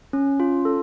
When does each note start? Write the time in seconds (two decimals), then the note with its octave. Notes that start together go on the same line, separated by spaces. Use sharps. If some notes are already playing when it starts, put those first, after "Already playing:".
0.13 C#4
0.40 F4
0.65 A4